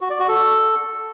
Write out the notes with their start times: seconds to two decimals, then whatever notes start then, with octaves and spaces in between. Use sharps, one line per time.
0.01 F#4
0.10 D5
0.19 F#4
0.29 A4